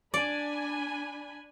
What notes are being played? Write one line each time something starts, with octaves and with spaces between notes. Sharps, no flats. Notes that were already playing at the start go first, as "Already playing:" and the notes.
D4 D5 G#5 B5